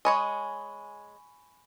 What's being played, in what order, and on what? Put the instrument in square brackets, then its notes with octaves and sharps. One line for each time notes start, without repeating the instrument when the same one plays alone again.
[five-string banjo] G#3 C#5 D#5 [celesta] G#5 B5 C#6